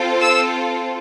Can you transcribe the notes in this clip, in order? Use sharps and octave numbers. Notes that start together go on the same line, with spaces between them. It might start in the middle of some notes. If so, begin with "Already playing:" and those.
Already playing: C4 F4 A4
E6